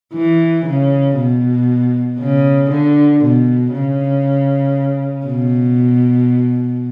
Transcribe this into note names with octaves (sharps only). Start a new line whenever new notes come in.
E3
C#3
B2
C#3
D3
B2
C#3
B2